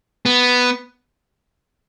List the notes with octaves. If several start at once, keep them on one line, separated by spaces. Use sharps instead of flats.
B3